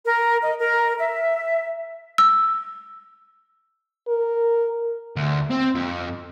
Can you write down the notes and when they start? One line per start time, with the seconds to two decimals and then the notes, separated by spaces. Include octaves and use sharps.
0.04 A#4
0.42 D#5
0.60 A#4
0.99 E5
2.18 E6
4.08 A#4
5.17 D2
5.51 C4
5.75 F2